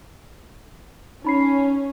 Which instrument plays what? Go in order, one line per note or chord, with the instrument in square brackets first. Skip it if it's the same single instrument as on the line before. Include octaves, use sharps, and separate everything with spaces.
[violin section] C#4 [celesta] D#4 B5 C7